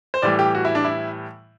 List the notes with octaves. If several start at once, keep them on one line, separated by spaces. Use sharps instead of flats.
C5
A2 E3 G3 D5
G4
F#4
E4
D4
E4